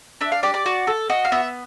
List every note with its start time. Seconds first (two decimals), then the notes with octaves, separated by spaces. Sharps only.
0.21 D4 E5
0.32 F5
0.43 G4 D5
0.54 D5
0.66 F#4
0.87 A4
1.10 F#4 D#5
1.25 F5
1.32 B3 E5